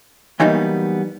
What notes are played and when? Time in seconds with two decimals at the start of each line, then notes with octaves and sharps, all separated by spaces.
0.40 E3 F#3 G3 A#3 B3 D#4